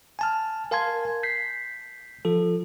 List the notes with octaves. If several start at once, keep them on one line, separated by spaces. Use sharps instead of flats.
G#5 A5 F6
A#4 F5 G#5 A5 C6 G#6
G6 B6 C7
F3 F4 A4